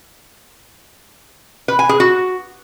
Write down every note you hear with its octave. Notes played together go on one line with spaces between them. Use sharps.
B4
G#5
G#4
F#4